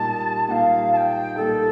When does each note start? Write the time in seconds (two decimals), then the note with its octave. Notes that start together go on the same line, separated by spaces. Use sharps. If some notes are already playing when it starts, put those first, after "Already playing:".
Already playing: A#2 G3 A#3 D#4 A5
0.48 A#2 G3 A#3 D#4 F5 G5
0.92 A5
0.97 G5
1.36 A#2 G3 A#3 D#4 A4